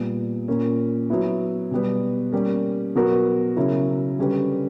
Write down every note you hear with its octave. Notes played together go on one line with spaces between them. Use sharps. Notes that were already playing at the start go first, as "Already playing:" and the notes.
Already playing: A#2 G3 B3
A#2 A#3 C#4
F#3 B3 E4
B2 G3 B3
G3 A#3 C#4
B2 F#3 B3 F#4 A#4
C#3 F#3 C#4 E4 A#4
D3 G3 C#4 G4 B4